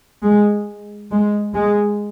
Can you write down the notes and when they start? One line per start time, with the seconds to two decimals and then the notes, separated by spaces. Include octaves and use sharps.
0.23 G#3
1.11 G#3
1.54 G#3